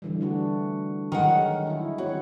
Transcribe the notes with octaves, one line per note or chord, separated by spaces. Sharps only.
D3 E3 G3
A3 D4 F#4
D#3 F#3 G#3 A#4 F#5
D#4 E4
C4 F#4 C#5